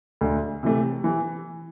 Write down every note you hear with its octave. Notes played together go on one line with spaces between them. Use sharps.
D2
C3 E3 A3
E3